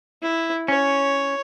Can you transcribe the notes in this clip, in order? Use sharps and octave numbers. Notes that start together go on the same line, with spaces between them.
E4
C#4 C#5